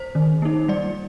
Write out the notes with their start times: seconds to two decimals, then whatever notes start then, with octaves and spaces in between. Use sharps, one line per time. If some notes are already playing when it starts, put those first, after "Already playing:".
Already playing: C5
0.15 D#3
0.42 A#3 D#4
0.68 G3 D5